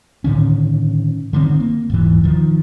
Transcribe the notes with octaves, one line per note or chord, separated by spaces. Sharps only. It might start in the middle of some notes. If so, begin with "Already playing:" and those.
A2 D3 D#3 C#4
D3 D#3 G3 C4
A#3
D#1 G#2 E3
D#3 F3